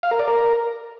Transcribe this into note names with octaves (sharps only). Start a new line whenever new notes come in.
F5
A#4
D5
A#4